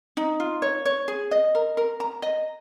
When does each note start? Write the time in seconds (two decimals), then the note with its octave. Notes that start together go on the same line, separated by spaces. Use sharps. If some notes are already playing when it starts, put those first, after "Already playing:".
0.17 D#4
0.40 F4
0.62 C#5
0.86 C#5
1.08 G#4
1.31 D#5
1.55 A#4
1.77 A#4
2.00 A#5
2.22 D#5